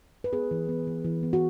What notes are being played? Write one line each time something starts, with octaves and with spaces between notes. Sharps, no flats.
B4
B3 G#4
E3
B3
E3
E3
B3
F#4